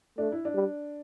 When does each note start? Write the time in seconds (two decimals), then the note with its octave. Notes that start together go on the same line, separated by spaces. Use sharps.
0.18 A3 D4
0.32 E4
0.45 D4
0.54 G3